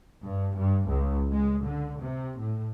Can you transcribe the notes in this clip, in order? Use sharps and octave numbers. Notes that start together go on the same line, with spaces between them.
G2
G2
C#2
G#3
D3
C3
A2